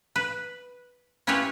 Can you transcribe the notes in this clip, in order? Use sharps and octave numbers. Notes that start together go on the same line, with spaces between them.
B4
C#4 E4 F4 G4 B4 C#5